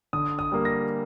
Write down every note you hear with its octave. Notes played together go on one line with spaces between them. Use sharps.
D3 D#6
D#6
G3 A#3
A#6